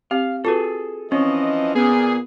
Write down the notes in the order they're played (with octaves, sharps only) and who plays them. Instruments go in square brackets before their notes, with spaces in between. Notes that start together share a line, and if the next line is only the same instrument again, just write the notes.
[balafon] C4 G4 [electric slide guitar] F5
[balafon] F4 F#4 B4 [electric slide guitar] G#4 A4
[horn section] E3 F3 D#5 [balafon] C4 [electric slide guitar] C#4
[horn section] A#2 G#4 [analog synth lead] B3